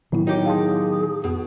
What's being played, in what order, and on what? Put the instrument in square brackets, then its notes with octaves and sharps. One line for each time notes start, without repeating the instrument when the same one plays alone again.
[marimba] A2 E4 [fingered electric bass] D#3 F#3 B3
[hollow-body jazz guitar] D#4 G4 [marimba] F#4 A#4 G5 [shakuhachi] C#5
[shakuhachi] G#4 [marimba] F5 A5 C6
[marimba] F2 [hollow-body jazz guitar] B2